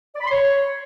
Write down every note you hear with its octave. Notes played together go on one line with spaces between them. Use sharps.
D5
B5
C6
C#5